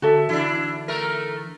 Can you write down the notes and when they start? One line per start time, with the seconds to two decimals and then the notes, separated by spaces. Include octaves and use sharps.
0.02 D3 F#4 A4 E5
0.29 D3 E3 D4 E4
0.88 A3 A#4